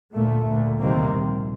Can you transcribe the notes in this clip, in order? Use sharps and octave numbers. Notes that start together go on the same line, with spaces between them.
D2 A#2 A3
D2 A#2
D#2 C3 D#3 G3 A#3 C4
A#1